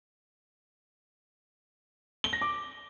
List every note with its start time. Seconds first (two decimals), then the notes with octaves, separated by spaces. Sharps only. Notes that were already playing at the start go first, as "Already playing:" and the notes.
2.24 G7
2.33 A#6
2.41 D6